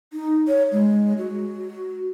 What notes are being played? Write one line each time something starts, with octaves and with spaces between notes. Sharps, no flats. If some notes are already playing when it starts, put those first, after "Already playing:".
D#4
C#5
G#3
F#4